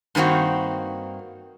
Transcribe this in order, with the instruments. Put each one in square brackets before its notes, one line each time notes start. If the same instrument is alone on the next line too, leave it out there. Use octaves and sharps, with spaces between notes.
[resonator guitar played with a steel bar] G2 D#3 A#3 C4 F#4